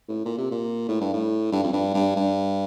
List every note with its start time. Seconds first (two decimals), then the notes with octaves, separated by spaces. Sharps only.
0.08 A2
0.25 A#2
0.38 C3
0.51 A#2
0.88 A2
1.01 G2
1.13 A2
1.52 G2
1.63 F2
1.73 G2
1.94 G2
2.16 G2